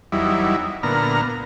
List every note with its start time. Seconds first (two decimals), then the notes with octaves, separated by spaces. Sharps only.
0.12 E2 F#3 G3 D#4 E4
0.83 A#2 D3 B3 A#5 F6